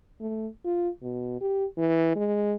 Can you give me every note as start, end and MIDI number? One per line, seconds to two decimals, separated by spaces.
0.21 0.47 57
0.65 0.89 65
1.03 1.39 47
1.41 1.65 67
1.78 2.13 52
2.16 2.55 56